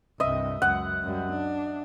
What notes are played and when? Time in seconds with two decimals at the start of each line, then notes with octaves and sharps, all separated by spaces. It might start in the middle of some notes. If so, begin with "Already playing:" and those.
0.20 C2 G2 D#5 E5
0.62 C#2 F#2 F#5
1.03 F#2 G3
1.31 D4